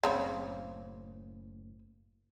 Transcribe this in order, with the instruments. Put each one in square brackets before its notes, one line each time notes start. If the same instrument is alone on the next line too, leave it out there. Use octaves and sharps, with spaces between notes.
[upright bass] F#1 A2 [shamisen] C#3 C4 C#5